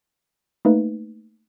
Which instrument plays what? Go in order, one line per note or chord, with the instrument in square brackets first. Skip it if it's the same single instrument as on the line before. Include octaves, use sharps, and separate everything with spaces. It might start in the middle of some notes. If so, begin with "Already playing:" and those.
[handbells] A3 A#3 D#4 B4